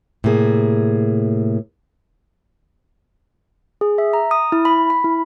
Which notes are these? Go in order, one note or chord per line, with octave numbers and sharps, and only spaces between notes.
A2 C3 A#3 G#4
G#4
E5
A#5
D#6
E4
B5
B5
E4